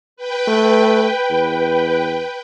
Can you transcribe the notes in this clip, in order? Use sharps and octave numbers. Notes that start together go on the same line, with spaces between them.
B4 G5
A3
E2